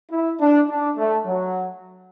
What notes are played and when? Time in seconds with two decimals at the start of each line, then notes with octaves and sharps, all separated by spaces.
0.11 E4
0.40 D4
0.70 D4
0.97 A3
1.26 F#3